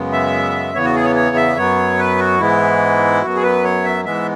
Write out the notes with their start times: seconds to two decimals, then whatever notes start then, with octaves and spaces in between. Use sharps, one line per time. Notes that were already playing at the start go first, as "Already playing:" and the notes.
Already playing: F#2 C#3 G#3 B3
0.13 E5
0.74 E2 C#3 E3 B3 C#5
0.85 F#4
0.95 G#4
1.05 C#5
1.16 C#5
1.36 E5
1.57 F#2 F#3 B3 C#5
1.99 B4
2.20 F#4
2.40 G#2 E3 G#3 B3 E4
3.23 F#2 F#3 B3 F#4
3.35 G#4
3.43 B4
3.64 C#5
3.84 E5
4.05 G#2 E3 G#3 B3 E5